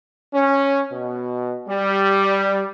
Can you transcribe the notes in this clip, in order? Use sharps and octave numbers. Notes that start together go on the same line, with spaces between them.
C#4
B2
G3